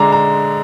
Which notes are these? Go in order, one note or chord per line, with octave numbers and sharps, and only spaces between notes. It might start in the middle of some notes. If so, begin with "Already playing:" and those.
Already playing: D3 G#3 D4 A#5 D6
A#5